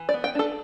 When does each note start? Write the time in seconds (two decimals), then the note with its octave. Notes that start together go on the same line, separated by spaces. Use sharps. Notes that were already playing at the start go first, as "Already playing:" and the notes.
Already playing: E3
0.09 D5
0.14 B3
0.24 G5
0.35 D4 A4